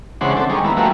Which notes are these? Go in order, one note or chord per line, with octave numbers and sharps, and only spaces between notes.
C#3 E3 G#3 D4 C5 F#5
C4 D4 A4
D#3 G3 G#3 C#4
A#3 B3 E4
F3 G3 A3 A#3 E4 F#4